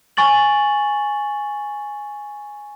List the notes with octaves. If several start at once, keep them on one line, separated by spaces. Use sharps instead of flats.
G#5 C#6 A6 F#7